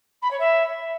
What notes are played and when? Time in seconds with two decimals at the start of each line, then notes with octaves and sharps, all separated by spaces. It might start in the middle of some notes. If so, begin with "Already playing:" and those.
0.22 B5
0.30 C#5
0.39 E5